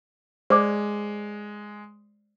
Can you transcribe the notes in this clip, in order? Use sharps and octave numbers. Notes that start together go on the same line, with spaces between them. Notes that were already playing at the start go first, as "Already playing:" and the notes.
G#3 C5 D5 D6